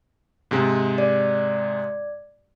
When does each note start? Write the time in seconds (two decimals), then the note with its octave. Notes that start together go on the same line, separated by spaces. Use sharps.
0.51 G#2 C3 G#3
0.98 D5